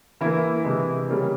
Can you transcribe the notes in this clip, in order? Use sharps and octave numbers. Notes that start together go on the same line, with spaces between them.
E3 A#3 E4 E5
C3 E3 G#3
C#3 G3 A#3